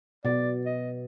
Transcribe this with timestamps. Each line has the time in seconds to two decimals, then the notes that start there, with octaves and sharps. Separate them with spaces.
0.25 B2 D5
0.66 D#5